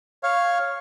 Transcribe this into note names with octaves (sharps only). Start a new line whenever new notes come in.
C#5 F5